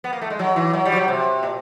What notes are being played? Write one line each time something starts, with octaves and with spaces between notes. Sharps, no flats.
B3
A#3
A3
G#3
F#3
E3
F#3
G3
F3
F#3
C3
A#2